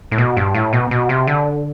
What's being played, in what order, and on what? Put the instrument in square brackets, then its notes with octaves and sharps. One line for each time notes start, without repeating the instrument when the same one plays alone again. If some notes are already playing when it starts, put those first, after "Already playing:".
[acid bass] A2
B2
G2
A2
B2
B2
C3
D3